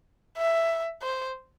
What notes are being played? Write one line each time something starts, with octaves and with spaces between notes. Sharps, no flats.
E5
C5